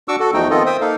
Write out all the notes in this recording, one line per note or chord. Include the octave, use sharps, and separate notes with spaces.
D4 F#4 C#6 D6 E6
F#4 A4
E2 F3 A3 D#4 F#4 G5
D#3 B3 C4 F4 A4 D#5
C5 E5 G5 D#6
A#3 D#4 A4 F5